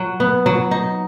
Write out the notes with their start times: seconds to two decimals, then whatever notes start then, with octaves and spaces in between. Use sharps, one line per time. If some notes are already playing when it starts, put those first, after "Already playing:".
Already playing: F#3
0.20 B3
0.46 F#3
0.71 D#4